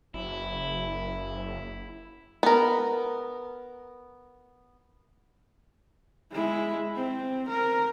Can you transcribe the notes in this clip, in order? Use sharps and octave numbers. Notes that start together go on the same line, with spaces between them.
F#1 E4
B3 A#4
G#3 E4
C4
A#4